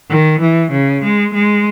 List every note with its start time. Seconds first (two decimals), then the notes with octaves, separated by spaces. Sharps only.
0.10 D#3
0.41 E3
0.72 C#3
1.04 G#3
1.34 G#3